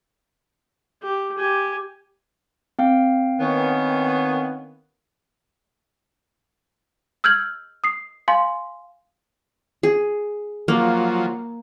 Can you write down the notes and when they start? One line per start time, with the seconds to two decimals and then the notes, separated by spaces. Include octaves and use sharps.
1.02 G4
1.38 G4 G#5
2.79 C4 F5 G5
3.39 D#3 B3 C#4
7.24 E6 F6 G6 G#6 F#7
7.84 D#6 C7
8.28 F5 G#5 C6
9.83 G#4
10.68 F3 F#3 A#3